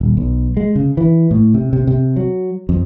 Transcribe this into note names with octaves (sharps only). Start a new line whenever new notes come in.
D#1
B1
G#3
C#3
E3
A2
C3
C3
C3
F#3
F2